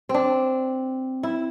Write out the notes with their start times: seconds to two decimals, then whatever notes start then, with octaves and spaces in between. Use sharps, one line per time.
0.09 C4
0.14 D4
1.23 E4